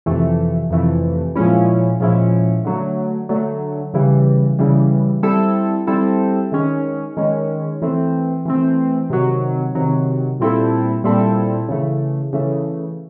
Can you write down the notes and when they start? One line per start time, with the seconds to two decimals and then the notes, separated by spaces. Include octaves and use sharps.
0.06 F2 C3 E3 A3
0.71 F2 C3 E3 A3
1.36 A#2 F3 G#3 C#4 E4
2.00 A#2 F3 G#3 C#4 E4
2.65 D3 F#3 A3
3.29 D3 F#3 A3
3.94 C#3 E3 G3
4.59 C#3 E3 G3
5.23 G3 C4 E4 A4
5.87 G3 C4 E4 A4
6.52 D#3 G#3 C#4
7.17 D#3 G#3 C#4
7.82 E3 A3 C4
8.45 E3 A3 C4
9.10 C3 D#3 F#3
9.75 C3 D#3 F#3
10.40 A#2 G3 C4 E4 A4
11.04 A#2 G3 C4 E4 A4
11.69 C#3 E3 A3
12.33 C#3 E3 A3